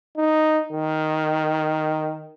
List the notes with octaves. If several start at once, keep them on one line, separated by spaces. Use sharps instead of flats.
D#4
D#3